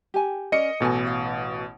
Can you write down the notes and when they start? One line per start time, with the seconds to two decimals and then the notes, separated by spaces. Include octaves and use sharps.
0.14 G4 G#5
0.52 C#4 A#4 D5 D#5 C#7
0.80 A1 B2 A4 G#5
1.07 F5